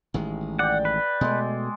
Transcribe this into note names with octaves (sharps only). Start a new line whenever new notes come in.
A1 D#3 G#3
D5 F#5 G5
B4
B2 G#3 A3